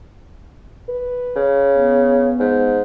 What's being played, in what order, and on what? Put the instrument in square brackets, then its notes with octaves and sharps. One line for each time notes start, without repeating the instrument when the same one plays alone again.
[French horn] B4
[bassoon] C#3
[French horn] B3
[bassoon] G#2